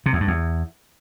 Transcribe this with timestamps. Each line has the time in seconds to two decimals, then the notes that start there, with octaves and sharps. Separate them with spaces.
0.06 C3
0.13 E2
0.20 G2
0.28 E2